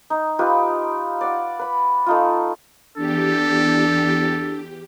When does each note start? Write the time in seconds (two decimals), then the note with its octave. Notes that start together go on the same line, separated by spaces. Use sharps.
0.10 D#4
0.39 D#4 F4 G4 B4
1.21 D5 F#5
1.59 B4 B5
2.06 A3 D#4 F4
2.96 E2 D4 G4 A4